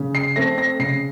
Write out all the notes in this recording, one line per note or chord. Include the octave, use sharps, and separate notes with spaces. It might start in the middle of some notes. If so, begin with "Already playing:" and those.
Already playing: C#3
C7
A3 C4 A#6
A#6
C#3 C7